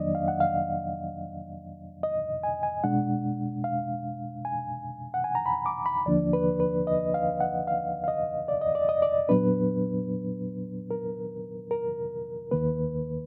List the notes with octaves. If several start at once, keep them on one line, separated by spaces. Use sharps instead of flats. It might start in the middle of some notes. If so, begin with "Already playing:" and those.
Already playing: F2 D#3 F#3 A#3 D4 D5 D#5
F5
F#5
F5
D#5
G#5
G#5
B2 G#3 D4 F#5
F5
G#5
F#5
G#5
A#5
B5
D6
B5
D#2 D3 F3 A#3 D4 D5
B4
B4
D#5
F5
F#5
F5
F5
D#5
D5
D#5
D5
D#5
D5
A#2 F#3 B3 D4 B4
A#4
A#4
D#2 D#3 A#3 B4